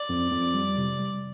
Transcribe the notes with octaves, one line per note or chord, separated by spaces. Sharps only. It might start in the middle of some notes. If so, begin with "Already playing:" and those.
Already playing: D5
F2
F2
G3
C3
G3